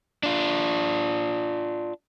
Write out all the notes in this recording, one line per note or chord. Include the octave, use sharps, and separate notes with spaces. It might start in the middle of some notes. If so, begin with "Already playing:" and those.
D4 F4